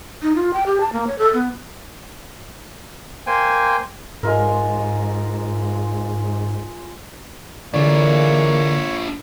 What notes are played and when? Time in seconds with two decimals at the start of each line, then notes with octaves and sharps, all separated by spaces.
0.22 D#4
0.35 F4
0.53 G5
0.66 G4
0.80 A5
0.93 A#3
1.07 C#5
1.19 A4
1.34 B3
3.27 A#3 C5 G5 G#5
4.23 G#2 G#3 F4 A#4
7.74 D3 E3 G#3 A#3 D4 F4 C#5 D5